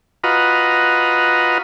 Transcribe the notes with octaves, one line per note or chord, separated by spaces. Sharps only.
F4 F#4 B4 D#5 A#5